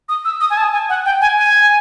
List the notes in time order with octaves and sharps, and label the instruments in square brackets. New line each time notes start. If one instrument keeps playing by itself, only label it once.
[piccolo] D#6
E6
D#6
G#5
A5
G#5
F#5
G5
G#5
G#5